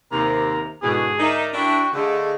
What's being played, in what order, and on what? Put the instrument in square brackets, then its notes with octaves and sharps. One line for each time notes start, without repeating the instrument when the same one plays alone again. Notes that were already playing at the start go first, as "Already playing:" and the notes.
[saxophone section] D#2 C3 [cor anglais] A#4
[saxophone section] E2 B2 [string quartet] G#2 D3 F#4 [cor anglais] G#4
[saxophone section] D#4 [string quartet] A#4 D5 E5
[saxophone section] D4 E4 [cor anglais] F#4 [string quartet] G5 C#6
[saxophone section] D3 [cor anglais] A3 [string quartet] G#4 D#5 F5